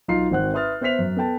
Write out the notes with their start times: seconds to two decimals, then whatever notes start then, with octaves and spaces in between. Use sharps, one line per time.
0.08 B1 D#4 F4 F5 C6 C7
0.31 G#1 C4 F#5 F#6
0.53 B4 E5 C6 D#6 F6 A6
0.81 B3 C5 E5 F6 B6 F7
0.99 F#2
1.16 B3 A4 G5 A5